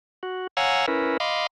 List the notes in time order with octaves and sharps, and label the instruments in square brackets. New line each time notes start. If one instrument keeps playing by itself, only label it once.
[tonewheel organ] F#4
C#5 F5 F#5 G#5 A#5 E6
C#4 E4 A#4 B4
D#5 F5 B5 C6 D6